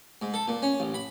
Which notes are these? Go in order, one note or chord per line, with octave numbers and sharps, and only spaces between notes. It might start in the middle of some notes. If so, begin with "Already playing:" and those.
G#2
A4
A#2
C#4
A1
B5